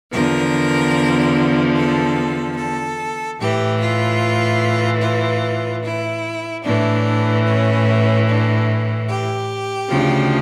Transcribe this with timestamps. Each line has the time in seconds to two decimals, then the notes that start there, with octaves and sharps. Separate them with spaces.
0.13 E2 D3 F3 A#4
1.76 A4
2.57 A4
3.39 A2 E3 G4
3.80 F4
5.02 F4
5.83 E4
6.64 A2 E3 D4
7.46 C#4
8.27 D4
9.09 G4
9.90 D2 C#3 F3